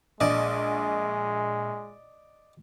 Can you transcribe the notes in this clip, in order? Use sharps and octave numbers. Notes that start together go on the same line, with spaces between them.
A#1 G#3 D5 D#5